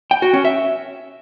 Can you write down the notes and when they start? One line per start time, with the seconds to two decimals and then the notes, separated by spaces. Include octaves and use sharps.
0.11 G5
0.22 F#4
0.33 C#4
0.45 E5